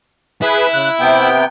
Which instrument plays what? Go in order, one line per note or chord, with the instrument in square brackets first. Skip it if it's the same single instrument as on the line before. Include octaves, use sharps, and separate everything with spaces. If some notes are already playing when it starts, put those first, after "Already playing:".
[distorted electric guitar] E4 [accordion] G#4 B4
[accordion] C#3 F#6
C3 B3 G5